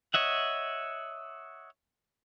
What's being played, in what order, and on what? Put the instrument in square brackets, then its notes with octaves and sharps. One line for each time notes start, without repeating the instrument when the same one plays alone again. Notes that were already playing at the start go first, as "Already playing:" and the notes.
[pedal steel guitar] C#5 D#5 E5 F#5